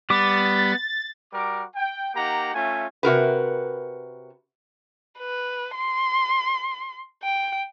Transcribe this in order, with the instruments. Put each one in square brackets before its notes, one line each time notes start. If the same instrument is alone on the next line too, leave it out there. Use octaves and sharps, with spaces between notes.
[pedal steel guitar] G3 D6 [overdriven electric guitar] B3 [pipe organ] B5 [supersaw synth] A6
[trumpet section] G3 F#4 A#4 D6
G5
A#3 D#4 G4 F#5 A#5
A3 C#4 F4 E5 G#5
[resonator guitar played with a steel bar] C3 F#4 A#4 B4
[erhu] B4
C6
G5